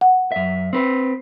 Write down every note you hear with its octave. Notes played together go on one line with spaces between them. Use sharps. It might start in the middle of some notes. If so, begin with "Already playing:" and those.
F#5
F#2 E5
C4 B4